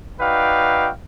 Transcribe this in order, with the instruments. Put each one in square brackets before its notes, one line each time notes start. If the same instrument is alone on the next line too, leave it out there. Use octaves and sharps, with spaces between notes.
[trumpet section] D#4 F#4 B4 D5 F5 G5